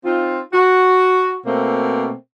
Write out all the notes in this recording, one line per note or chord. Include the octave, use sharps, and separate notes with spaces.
C4 D#4 F4
F#4
B2 A3 A#3 C4